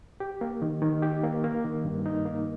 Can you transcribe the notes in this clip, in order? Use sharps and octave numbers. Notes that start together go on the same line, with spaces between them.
G4
A#3
D#3
D#3
G4
A#3
A#3
D#3
G2
D#4
A#3